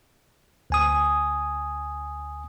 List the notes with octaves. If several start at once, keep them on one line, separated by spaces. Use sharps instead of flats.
D2 G#5 D#6